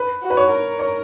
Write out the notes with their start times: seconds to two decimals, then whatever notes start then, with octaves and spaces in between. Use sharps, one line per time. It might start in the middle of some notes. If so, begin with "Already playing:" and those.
Already playing: B4
0.23 F#4
0.30 B4
0.37 C#5
0.50 A#4
0.79 C#5